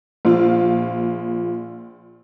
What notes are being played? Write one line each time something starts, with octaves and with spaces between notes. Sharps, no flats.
A#1 F4